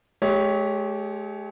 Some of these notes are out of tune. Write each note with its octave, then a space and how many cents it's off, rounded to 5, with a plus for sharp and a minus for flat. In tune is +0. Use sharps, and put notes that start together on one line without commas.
G#3 +45 G4 +10 C#5 +10